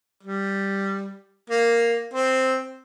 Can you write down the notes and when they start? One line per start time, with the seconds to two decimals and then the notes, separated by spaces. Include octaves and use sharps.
0.23 G3
1.50 A#3
2.14 C4